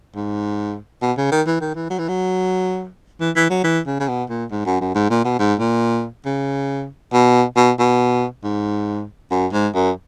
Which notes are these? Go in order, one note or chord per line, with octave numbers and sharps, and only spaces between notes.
G#2
B2
C#3
D#3
E3
D#3
E3
F#3
E3
F#3
E3
E3
F#3
E3
C#3
C#3
B2
A#2
G#2
F#2
F#2
G#2
A#2
B2
G#2
A#2
C#3
B2
B2
B2
G#2
F#2
G#2
F#2